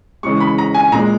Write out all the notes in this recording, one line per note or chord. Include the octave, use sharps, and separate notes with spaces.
C#3 E3 G#3 C#6
B5
A#5
G#5
A#2 G#3 A#5